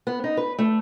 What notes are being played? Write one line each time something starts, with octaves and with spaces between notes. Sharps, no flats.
B3
D#4
B4
A3